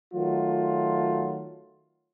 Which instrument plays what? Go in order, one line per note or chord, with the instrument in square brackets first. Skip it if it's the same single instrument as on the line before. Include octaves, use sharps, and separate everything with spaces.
[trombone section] D#3 F#3 A3 F4